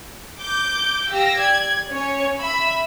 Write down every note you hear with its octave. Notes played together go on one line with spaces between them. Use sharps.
D6 G6
G4 F5 E6 A#6
D5 G#6
C#4 C#5
E5 B5 E6